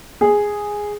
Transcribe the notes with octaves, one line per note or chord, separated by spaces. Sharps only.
G#4